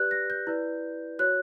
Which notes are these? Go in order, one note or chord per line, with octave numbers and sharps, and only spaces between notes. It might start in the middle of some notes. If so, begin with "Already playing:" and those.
Already playing: G4 B4 D5 F#6 G6
A#6
G6
E4 B4 D5
F#4 C#5 F#6